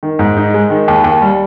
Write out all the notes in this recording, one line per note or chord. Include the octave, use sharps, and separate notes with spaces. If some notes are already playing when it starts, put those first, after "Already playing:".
D#3
G#2
D#4
G#3
D#3
D#2
D#2
G3